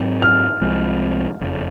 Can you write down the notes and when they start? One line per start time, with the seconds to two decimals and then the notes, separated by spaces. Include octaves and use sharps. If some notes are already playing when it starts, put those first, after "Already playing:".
Already playing: G#2 F#3 C4
0.22 F6
0.61 C2 C3 F3 G#3
1.41 F#1 F2 C#3 F3